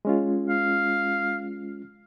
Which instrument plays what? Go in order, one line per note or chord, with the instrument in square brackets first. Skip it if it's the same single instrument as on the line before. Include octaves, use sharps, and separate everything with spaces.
[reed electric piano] G#3 C#4 F4
[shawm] F5